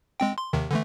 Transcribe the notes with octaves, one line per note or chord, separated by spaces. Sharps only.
G#3 C4 G5
C6
D#2 C3 D#3
D3 E3 A3